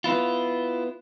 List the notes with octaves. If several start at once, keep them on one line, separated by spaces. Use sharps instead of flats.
B3 E4 F4